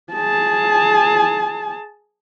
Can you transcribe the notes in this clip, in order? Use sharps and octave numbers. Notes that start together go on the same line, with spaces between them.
G#4 A5